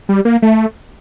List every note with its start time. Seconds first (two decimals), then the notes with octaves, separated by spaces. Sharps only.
0.09 G3
0.25 A#3
0.42 A3